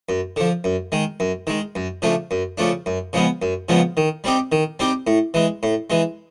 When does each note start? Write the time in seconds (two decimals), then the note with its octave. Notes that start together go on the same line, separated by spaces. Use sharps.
0.09 F#2
0.36 D3 F3
0.64 F#2
0.92 D#3 G#3
1.20 F#2
1.47 D#3 G#3
1.75 F#2
2.02 C#3 F3 A3 D4
2.31 F#2
2.58 C#3 F3 A3 D4
2.86 F#2
3.13 C#3 F3 G#3 B3
3.42 F#2
3.69 C#3 F3 G#3 B3
3.97 D#3
4.24 G3 C4 D#4 G4
4.52 D#3
4.79 G3 C4 D#4 G4
5.07 A2
5.34 E3 G#3
5.63 A2
5.90 E3 G#3